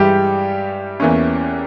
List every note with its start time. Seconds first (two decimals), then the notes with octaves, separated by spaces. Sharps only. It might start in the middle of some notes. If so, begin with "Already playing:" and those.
Already playing: G2 E3 G3 G#3 G4
1.00 E2 E3 A#3 C#4